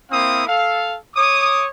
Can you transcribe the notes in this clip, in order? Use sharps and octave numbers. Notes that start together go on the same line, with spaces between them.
A#3 C4 E4 F5 D#6
A4 F5
C#5 D6 D#6